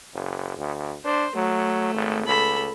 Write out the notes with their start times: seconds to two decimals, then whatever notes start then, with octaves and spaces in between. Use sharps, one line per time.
0.14 F#1
0.57 D2
1.04 D4 C5
1.35 F#3 A3
1.94 G#1
2.27 C#2 A4 B5